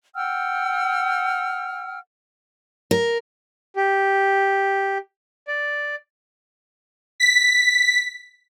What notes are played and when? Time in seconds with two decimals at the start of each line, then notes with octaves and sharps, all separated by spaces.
0.15 F#5 G5 E6 F6
2.91 A#4
3.76 G4
5.48 D5
7.20 B6